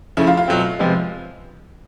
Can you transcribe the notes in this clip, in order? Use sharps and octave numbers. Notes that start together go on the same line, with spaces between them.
C#3 F3 A3 C#4 E4
F4
F4
B2 F#3 A3 C4
C3 F3 G#3 B3